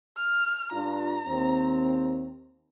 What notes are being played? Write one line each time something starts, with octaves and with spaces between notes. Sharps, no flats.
F6
G2 D4 F4 A#5
D#2 C4